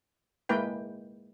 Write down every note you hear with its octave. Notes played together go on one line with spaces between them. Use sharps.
G#3 A#3 E4 B4 G5